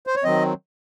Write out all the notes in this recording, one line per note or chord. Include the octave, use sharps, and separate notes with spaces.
C5
C#5
D#3 F#3 C4 D#5